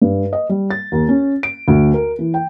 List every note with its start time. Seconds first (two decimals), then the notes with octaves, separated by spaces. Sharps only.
0.02 G2
0.33 D#5
0.49 G3
0.70 A6
0.92 D#2
1.09 C#4
1.43 D7
1.68 D2
1.94 A#4
2.19 E3
2.34 G5